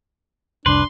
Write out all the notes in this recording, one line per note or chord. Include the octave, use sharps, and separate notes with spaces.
F1 C2 D4 B4 C6